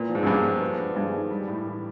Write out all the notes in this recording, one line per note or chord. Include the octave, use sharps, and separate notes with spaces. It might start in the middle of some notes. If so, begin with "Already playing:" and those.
Already playing: A#2 B3
F3
G#2
F#2
G2 G#3
F3
B3
D4
G2 G#3
D#3
G3
A2
E3